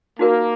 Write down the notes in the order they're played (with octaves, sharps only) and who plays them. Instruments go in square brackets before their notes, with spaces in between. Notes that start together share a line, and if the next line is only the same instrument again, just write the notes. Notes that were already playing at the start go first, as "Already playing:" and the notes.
[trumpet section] A#3 [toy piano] D#4 F#4 A#4